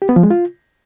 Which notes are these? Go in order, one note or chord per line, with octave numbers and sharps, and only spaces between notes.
G4
B3
F3
G#3
F4